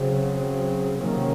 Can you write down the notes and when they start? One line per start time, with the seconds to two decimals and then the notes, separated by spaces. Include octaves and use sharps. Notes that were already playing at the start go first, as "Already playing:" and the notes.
Already playing: C#3 F#3 C4
1.00 C3 D#3 F#3 A#3 C#4